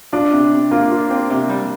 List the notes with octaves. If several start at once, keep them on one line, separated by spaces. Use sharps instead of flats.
D4 F4
C3
C3
A#3 F4
F4
C4
C3
G3